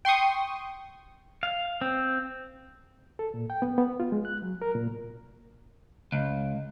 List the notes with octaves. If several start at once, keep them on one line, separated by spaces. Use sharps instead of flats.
G5 C6 C#6 D#6
F5
C4
A4
A#2
G5
B3
B3
F4
G#3
F#6
F#3
A#4
A#2
C#2